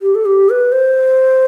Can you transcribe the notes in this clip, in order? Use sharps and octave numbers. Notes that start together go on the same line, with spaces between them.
G4
A4
G4
B4
C5